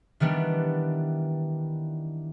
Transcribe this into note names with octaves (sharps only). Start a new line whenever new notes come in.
D#3 E3 G3 B3 D4